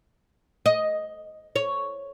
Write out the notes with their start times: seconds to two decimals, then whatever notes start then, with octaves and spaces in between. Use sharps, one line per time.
0.66 D#5
1.56 C#5